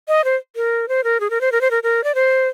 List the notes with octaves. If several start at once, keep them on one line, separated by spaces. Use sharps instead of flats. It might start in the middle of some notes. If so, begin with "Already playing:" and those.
D#5
C5
A#4
C5
A#4
G#4
A#4
C5
A#4
C5
A#4
A#4
D5
C5